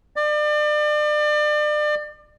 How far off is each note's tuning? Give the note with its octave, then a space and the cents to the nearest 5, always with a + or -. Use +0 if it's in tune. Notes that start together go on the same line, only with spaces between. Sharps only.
D5 +35